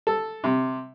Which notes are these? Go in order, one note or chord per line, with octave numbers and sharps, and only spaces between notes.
A4
C3